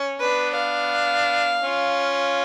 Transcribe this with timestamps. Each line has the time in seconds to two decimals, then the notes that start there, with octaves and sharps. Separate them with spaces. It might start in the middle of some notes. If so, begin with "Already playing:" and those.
Already playing: C#4
0.19 B3 D4 B4
0.55 F5
1.63 C#4 F4